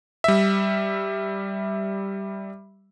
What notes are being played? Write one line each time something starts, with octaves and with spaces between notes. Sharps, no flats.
G3 E5